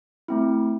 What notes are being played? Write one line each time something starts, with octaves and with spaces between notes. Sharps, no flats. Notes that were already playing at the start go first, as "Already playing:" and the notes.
A3 C4 E4